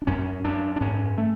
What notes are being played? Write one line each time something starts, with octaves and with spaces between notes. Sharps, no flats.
D4
F#2 C#4
F#2 D4
D4
G#2 C#4
A3